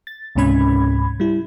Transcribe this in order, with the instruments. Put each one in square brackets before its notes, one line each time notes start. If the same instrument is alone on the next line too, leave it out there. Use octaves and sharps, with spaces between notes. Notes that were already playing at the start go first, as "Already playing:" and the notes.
[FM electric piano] A6
C#2 G#2 C3 C#4 B5 G#6
G3 E4